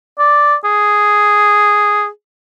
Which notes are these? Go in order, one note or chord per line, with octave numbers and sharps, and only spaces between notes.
D5
G#4